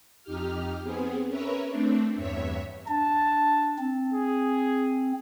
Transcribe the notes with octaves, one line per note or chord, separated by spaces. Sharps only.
F2 D#4 G4 F6
B3 C4 G#4
C#4 A#4 B4 C#5 E5
A3 C4 D4
E2 G2 C#5 E5 B6
D4 A5
C4
G#4